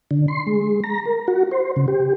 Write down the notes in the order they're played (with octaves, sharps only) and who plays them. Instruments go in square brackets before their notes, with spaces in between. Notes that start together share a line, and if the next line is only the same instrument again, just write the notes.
[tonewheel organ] D3
C6
G#3
A#5
A#4
F#4
C5
C#3
G4